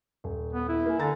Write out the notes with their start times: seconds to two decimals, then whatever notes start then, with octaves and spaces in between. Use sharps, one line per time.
0.24 D#1
0.53 B3
0.69 E4
0.86 A#3 G#5
0.99 D3 G#5 A#5 A6